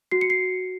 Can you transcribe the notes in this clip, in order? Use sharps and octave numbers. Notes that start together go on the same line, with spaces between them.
F#4 C7
C#7
C7